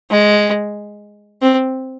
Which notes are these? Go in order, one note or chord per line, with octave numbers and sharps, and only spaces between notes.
G#3
C4